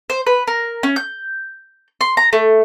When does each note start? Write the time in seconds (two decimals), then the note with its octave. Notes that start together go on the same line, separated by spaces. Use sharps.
0.10 C5
0.27 B4
0.47 A#4
0.83 C#4
0.96 G6
2.01 C6
2.17 A#5
2.33 A3